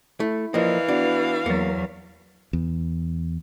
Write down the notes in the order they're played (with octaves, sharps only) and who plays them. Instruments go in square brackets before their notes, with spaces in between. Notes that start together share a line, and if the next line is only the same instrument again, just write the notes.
[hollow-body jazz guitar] A3 [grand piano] E4
[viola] E3 F5 [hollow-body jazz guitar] F3 A#3 [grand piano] D5 D#5
[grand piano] B3 F#4 [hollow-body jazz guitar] D4
[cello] E2 F#3 [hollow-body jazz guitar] A#3 [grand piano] A6 C#7
[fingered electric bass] E2